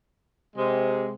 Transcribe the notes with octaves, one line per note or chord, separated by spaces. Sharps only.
C3 G#3